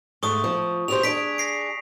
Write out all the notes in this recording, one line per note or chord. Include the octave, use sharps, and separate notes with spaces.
G#2 A3 C#6 D#6
F3
G4 G#4 C5 F7
D4 G#4 B6 D7
A#6 C7 D7